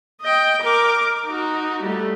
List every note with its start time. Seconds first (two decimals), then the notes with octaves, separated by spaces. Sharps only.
0.21 D#5 G5
0.62 A#4 D6
1.26 D#4 F#4
1.83 G3 A3